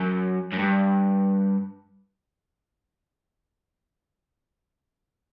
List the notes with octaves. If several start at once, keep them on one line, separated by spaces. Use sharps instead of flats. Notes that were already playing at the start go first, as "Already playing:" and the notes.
Already playing: F#2
F#2
G2